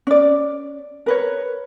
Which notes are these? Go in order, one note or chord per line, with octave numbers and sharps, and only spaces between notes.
C#4 D5
A#4 B4 C#5